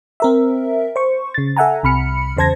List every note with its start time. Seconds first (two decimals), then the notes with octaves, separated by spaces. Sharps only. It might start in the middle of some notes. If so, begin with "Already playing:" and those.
0.20 C4 A#4 E5
0.96 C5 C#6
1.34 C#3 A6
1.56 A4 E5 F#5 G#5 A#5
1.83 C2 C3 B5 F6 C#7
2.37 E2 C#3 C5 A5 G#6 A#6